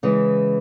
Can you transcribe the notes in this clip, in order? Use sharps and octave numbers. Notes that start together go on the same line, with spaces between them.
C#3 E3 G#3